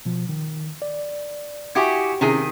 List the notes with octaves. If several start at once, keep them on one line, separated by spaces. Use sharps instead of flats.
B2 F3
D#3
D5
E4 F#4 G4 G#5 D#6 G#6
C3 D#3 C#4 E4 G#4